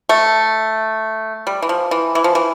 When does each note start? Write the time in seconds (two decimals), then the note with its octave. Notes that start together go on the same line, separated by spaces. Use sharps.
0.09 A3
1.47 G3
1.62 E3
1.69 F3
1.91 E3
2.15 E3
2.24 F3
2.35 E3